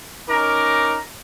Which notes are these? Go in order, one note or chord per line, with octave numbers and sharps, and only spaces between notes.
C#4 D#4 A#4 A#5 D6